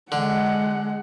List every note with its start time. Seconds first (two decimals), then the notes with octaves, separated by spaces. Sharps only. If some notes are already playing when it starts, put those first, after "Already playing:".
0.12 D3 G#3 F#5